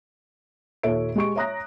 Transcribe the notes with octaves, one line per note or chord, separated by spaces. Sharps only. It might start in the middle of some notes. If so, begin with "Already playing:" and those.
D#2 A#2 A4 C#5 E5 D7
G#3 G4 C#6 D7
C#5 E5 A#5 D#6 F#6 A#6